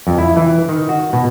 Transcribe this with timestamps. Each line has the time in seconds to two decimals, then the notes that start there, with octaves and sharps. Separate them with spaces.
0.07 F2
0.18 E4
0.36 E3
0.69 D#3
0.89 F#4
1.13 B2